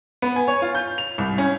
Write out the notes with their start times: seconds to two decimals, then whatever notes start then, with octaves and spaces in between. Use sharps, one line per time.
0.22 B3
0.36 G#5
0.48 C#5
0.62 F4
0.75 G6
0.98 F7
1.18 C2
1.38 C#4